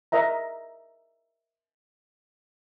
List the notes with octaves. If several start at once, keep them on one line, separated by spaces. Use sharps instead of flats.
A#4 D#5 E5 A#5